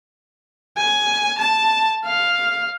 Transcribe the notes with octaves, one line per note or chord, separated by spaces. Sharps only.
G#5
A5
F5